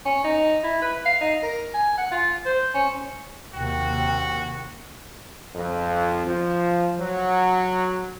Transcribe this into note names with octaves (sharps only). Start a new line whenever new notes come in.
C#4
D#4
E4
B4
F5
D#4
A#4
G#5
F#5
F4
C5
C#4
D#2 C3 A#3 F#4 G5
F2
F3
F#3